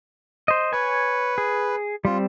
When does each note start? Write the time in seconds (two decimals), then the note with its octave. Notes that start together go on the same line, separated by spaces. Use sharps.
0.48 C5 D#5
0.73 B4 C#5 G#5
1.38 G#4
2.05 G3 C4 F4